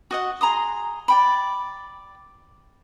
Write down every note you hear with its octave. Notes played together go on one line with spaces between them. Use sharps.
F#4 D#5 F#5
G#4 A#5 C6 D#6
D5 G5 B5